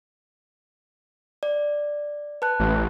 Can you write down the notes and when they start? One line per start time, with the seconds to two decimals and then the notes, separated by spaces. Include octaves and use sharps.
1.43 D5
2.42 B4 A5 F#6
2.59 A1